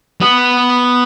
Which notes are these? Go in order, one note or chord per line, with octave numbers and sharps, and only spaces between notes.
B3